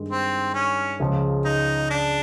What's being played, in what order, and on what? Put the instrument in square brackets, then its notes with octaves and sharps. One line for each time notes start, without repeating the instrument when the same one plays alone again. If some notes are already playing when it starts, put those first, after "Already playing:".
Already playing: [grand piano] G2 D#3 G#3 D#4
[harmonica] C4
C#4
[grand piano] C#2 C#3 F3
[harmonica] D#4
D4